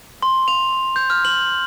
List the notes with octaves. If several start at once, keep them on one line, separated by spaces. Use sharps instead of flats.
C6
F7
G6
F6
F#7